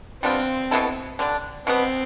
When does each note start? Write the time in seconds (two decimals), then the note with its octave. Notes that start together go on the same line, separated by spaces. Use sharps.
0.23 G3 B3 C4 D4 F4
0.71 B2 B3 E4 A4
1.19 D3 G3 D4
1.67 B2 G3 B3 C4